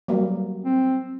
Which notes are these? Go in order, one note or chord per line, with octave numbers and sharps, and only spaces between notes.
F#3 G3 A#3
C4